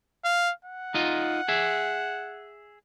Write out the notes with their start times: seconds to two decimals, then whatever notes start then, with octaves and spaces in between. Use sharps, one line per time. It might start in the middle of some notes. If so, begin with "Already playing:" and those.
0.25 F5
0.65 F#5
0.94 D#4 F4 D#5
1.48 G#4 E5